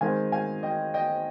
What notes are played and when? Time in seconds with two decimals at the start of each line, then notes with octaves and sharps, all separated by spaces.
0.01 D#3 G#3 C4 F5 G#5
0.32 F5 G#5
0.63 D#5 G5
0.94 D#5 G5